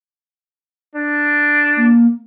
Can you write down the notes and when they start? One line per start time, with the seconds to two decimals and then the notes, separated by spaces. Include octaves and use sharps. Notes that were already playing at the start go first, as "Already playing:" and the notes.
0.95 D4
1.77 A#3